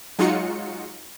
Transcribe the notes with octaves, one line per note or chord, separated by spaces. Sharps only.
F#3 G#3 D#4 F4 F#4 C#7